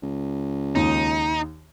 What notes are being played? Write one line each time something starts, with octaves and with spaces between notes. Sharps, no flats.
C#2
D#2 D#4